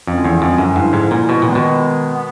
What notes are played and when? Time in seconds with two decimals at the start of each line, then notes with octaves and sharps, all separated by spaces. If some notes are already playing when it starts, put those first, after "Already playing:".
0.07 F2 D3 F3 G#3 C#4 E4
0.24 E2
0.42 F2
0.58 F#2
0.76 G2 D3 F3 G#3 C#4 E4
0.93 G#2
1.11 A#2
1.29 B2
1.42 A#2 D#3 G#3 B3
1.55 B2
2.15 B3